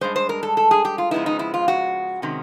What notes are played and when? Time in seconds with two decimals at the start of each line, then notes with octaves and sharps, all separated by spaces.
0.01 G2 D#3 G#3 C5
0.16 C5
0.29 A#4
0.43 A4
0.57 A4
0.71 G#4
0.85 G4
0.98 F4
1.11 C#3 F3 G#3 B3 D#4 E4
1.26 D#4
1.39 E4
1.54 F4
1.68 F#4
2.22 C3 D#3 G#3 C#4